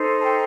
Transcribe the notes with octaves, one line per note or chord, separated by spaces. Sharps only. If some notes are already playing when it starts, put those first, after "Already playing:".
Already playing: D#4 A4 C5
A5
G5